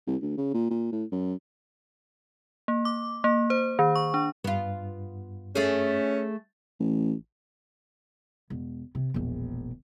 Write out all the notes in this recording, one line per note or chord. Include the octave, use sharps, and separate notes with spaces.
C2
D2
C#3
A#2
A#2
A2
F#2
A#3
D6
A#3
C5
D#3
C#6
D4
G2 B3 F4
A3 C#4 G#4
A1
E1
C3
E1 A#1